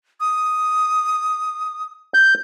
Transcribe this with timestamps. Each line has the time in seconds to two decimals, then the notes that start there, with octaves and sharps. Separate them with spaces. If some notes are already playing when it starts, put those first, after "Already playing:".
0.20 D#6
2.14 G6